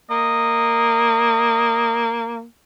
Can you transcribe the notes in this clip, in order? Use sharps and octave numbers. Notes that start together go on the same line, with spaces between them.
A#3 D#5